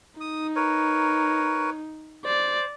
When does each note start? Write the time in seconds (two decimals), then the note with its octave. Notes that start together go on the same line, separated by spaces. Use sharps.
0.21 D#4 D#6
0.56 A#4 B4 C#5
2.25 C5 D5